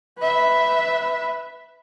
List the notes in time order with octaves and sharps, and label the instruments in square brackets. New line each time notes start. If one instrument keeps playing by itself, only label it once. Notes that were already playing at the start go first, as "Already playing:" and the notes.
[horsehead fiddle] B4 E5